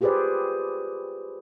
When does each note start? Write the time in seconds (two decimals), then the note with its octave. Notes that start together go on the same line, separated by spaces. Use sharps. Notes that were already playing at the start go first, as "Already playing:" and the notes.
0.01 F4 G4 G#4 B4 C5 D5